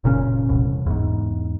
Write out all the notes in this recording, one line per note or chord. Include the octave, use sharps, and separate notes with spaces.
F#1 A#2 C#3 C#4
E1 C2 A2
E2 G#2